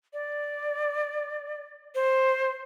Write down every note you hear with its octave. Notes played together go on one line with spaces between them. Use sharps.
D5
C5